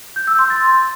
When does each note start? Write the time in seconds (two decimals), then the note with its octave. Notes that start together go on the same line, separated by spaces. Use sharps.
0.16 G6
0.27 E6
0.39 C6
0.50 A6